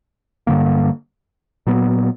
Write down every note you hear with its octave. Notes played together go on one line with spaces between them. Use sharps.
G2 D3 A#3
A#2 F#3 B3